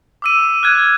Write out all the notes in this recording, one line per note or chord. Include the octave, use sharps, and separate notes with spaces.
D6 E6 D#7
F6 F#6 G#6 D#7